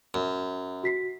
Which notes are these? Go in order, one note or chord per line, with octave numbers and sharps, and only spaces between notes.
F#2
F#4 B6 C7